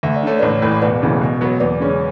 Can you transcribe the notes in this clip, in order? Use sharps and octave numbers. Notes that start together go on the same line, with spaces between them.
D2 E5
D5
D3 A3 C#5
A1 B4 D5
A2 E3
E1 B4 D5
D2 C#3 E3
B2
F#3 B3
E2 B4 D5
C#3 G#3 C#4